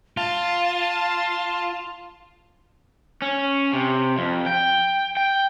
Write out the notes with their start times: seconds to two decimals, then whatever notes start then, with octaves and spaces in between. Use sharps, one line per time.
0.17 F4 A5
3.22 C#4
3.73 C3
4.18 F2
4.46 G5
5.17 G5